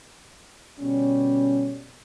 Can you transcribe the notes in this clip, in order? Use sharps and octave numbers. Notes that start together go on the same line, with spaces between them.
B2 D3 G3 C#4